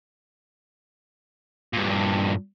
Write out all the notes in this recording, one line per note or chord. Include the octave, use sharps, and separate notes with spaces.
G2 A#2